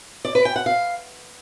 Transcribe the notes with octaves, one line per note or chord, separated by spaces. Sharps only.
D5
B4
G5
F#5
F5